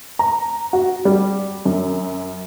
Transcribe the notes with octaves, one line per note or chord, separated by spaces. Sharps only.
A#5
F#4
G3
F#2